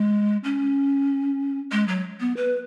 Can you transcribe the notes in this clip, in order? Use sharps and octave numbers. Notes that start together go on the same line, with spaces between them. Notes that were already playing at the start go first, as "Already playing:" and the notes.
Already playing: G#3
C#4
G#3
F#3
B3
B4